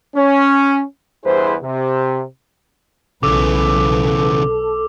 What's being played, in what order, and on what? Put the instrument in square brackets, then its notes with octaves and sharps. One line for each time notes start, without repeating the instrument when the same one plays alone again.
[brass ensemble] C#4
E2 G2 E4 G#4 B4 C5
C3
[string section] B1 B4 [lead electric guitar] C#3 E3 [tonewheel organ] A4 [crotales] D6 E6